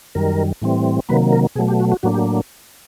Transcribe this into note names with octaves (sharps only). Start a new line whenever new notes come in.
F#2 D#3 G3 A#4
A2 E3 G3 C4
C3 D#3 F#3 A#3 B4
A#4
B2 F#3 A3 G#4
G4
F#4
F#4
A2 F#3 A#3 D4 F#4
G4